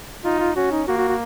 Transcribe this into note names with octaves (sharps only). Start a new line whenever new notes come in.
D#4 F4
F4
C#4 F#4
D#4
A#3 F#4
F#4
F#4